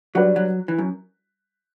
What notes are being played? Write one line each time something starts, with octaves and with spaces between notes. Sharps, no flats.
F#3 G3 D4 F#4 B4 D5
F#3
E3
F#2